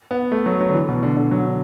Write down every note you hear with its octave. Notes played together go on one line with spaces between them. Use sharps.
B3
A3
F#3
F#3
D3
E3
B2
D3
D3
F#3
D3